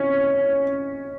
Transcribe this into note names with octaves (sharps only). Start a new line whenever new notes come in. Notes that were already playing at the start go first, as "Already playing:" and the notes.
Already playing: C#4